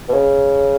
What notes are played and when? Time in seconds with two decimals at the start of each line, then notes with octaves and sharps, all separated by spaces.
0.09 B2
0.13 C#3